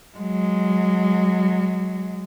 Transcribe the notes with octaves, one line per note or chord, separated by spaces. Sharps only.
F#3 G#3